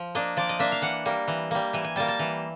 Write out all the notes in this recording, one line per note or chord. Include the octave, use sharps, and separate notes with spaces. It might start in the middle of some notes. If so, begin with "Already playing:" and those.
Already playing: F3
A#3 D4 D#5
F3 D5
D#5
A#3 D4 E5
F5
E3 F#5
G3 A#3
E3
G3 A#3
E3 G#5
G#5
G3 A#3 A5
A5
E3